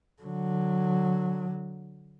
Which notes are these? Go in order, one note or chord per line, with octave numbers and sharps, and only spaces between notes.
D3 F#3